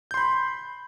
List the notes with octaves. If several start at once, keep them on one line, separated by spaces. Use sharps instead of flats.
B5 C6 G6